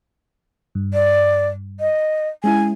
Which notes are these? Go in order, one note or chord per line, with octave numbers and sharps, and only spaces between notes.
G2
D5
D#5
G#3 C#4 E4 G#5